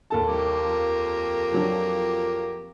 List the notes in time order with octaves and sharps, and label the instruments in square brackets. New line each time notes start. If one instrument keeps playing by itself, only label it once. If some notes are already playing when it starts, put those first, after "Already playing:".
[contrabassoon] A#1 [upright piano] D#2 A4 A5
[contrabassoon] C2 [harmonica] A#3 G4
[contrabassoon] F2
[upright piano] F3 F#3 D4